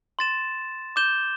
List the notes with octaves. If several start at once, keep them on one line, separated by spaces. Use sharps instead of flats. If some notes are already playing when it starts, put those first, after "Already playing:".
C6 A6 E7
D6 G6 E7 G7